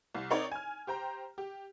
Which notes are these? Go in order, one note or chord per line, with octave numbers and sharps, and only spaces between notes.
C2
C4 D#4 A#4 C#5 D5
G#5 F6
G4 C5 G5 A#5
G4